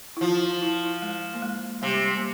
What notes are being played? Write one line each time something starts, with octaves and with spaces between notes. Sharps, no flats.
E4
F3 F4
E4
G#3
A#3
G#3
C3 G3
A#3